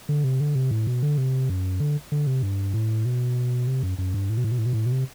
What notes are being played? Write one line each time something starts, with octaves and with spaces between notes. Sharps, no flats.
D3
C3
D3
C3
A2
B2
D3
C3
F#2
D3
D3
C3
G2
A2
B2
C3
F#2
F#2
G2
A2
B2
A2
B2
A2
B2
A2
B2
C3